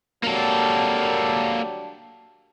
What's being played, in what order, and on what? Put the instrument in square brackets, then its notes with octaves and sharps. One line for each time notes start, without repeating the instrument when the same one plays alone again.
[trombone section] F#3 G3 D4 [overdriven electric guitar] A#3 A4